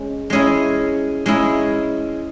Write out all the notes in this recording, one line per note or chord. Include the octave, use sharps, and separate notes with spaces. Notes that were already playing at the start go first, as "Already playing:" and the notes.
Already playing: G#3 C#4
G#3 C#4 E4 G#4
G#3 C#4 E4 G#4